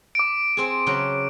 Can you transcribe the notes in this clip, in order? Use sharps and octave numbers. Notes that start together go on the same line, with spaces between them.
D6 D7
C4 G#4
C#3 F#3 G5